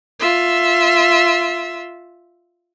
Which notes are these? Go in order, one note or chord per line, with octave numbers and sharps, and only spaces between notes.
F4 E5